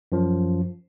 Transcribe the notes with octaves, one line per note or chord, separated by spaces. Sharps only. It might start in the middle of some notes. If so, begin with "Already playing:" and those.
F#2 F3